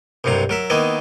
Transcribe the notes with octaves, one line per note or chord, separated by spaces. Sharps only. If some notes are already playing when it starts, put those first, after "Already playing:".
C2 G2 C3 F#3 A#5
F#3 A#4 E5
D#3 A#3 B3 E4 D#5